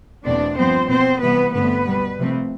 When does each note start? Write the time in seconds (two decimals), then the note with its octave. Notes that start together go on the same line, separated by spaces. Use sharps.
0.24 E2 B2 A3 C4 D4 D5
0.56 G2 F3 B3 C4 C5
0.89 B2 B3 C4 C5
1.21 C3 E3 G3 B3 B4
1.53 G2 D3 A3 B3 C4 B4
1.85 B2 G3 B3
2.18 C3 F3 A3 C4